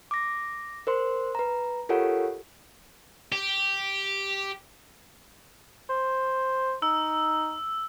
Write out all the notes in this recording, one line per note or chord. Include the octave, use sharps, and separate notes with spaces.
D6 A#6
A#4 C5 C6
B4 A#5
F4 G4 A4 A#4 C#5 F#5
G4
C5
D#4 E6